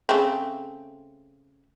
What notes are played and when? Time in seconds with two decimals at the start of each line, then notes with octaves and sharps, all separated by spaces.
0.09 C#3 A3 C4